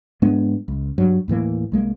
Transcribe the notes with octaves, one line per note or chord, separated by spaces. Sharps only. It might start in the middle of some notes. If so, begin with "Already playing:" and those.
G#2 G#3 B3 D4
C#2
G2 F#3
D#2 A2 E3 A#3
C2 G#3 A#3